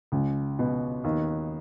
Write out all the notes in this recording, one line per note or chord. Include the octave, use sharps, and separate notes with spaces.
C#2
B2
D#2